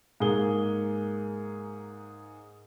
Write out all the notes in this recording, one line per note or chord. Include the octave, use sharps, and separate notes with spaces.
G#2 A#3 G#4 G7